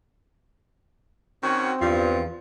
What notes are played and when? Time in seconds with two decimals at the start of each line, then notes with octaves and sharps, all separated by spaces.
1.43 D#3 C4 C#4 F#4
1.81 E2 G2 F3